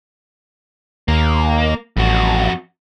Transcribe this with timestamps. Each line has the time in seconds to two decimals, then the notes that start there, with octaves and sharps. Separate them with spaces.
1.08 D#2 A#3
1.97 A1 F2 F#4